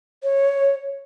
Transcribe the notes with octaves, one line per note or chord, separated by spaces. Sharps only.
C#5